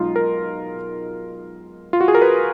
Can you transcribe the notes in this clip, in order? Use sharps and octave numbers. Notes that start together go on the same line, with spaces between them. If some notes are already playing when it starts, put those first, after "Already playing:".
Already playing: B1 B2 G#3 D#4 F4
A#4
F4
F#4
G#4
A#4
B4